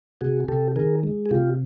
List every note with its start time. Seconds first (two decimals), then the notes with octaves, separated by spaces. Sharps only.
0.21 C3 F#4 G#4
0.48 C3 G4 A4
0.76 D#3 G#4 A#4
1.03 G#3
1.26 G#4
1.31 C3 F4 G4